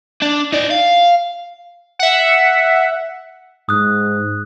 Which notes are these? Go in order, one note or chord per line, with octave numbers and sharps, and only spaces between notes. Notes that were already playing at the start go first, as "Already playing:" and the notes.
D4
D#4 D5
F5
E5 F#5
G#2 D#6 F#6